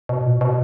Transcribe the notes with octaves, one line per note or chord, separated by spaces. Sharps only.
B2
A#2
B2